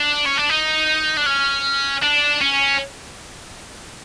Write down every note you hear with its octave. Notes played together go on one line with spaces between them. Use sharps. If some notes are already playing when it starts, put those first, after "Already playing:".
Already playing: D4
C#4
D4
D#4
D4
C#4
D4
C#4